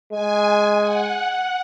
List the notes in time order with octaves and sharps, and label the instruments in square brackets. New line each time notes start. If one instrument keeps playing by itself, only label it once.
[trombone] G#3 [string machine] G#5
[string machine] F#5